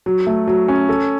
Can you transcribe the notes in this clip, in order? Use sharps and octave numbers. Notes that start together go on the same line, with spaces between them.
F#3
A3
F#3
C#4
A4